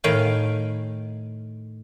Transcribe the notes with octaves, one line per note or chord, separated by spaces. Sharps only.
A2 D#3 F5 G5 G#5